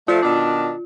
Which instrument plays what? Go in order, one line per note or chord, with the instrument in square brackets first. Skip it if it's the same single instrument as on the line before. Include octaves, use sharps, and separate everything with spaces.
[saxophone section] F3 A3 [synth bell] F4
[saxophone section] B2 D#3 D4